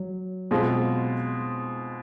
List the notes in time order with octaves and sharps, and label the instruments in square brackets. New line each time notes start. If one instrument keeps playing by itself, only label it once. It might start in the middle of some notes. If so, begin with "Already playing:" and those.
Already playing: [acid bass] F#3
[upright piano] B2 G#3 C4 F4